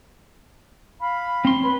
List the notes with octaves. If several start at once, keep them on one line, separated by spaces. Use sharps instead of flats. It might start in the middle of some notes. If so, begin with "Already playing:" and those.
F5 B5
C4 C6
B4 C#5 B5